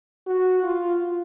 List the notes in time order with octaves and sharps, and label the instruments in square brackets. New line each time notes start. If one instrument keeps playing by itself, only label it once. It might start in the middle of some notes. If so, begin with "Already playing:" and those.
[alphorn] F#4
F4